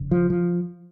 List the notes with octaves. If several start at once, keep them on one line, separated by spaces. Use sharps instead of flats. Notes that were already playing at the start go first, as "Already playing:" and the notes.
Already playing: F1 C#3
F3
F3